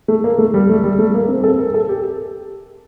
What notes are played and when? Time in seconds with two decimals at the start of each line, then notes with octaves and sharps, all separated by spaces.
0.08 A3
0.24 A#3
0.38 A3
0.54 G3
0.69 A3
0.84 G3
0.99 A3
1.14 A#3
1.28 C4
1.44 A4
1.59 A#4
1.74 A4
1.89 G4